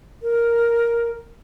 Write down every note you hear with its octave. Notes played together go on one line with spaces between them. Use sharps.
A#4